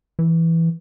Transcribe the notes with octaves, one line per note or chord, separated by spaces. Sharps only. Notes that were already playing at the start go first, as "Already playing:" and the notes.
E3